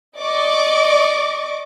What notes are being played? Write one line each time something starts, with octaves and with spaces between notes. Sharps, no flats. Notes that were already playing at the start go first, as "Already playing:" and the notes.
D5 D#5 C#6 D6